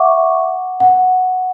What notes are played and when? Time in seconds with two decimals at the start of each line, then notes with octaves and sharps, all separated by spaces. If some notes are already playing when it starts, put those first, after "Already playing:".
Already playing: E5 F#5 C#6 D6
0.80 F#5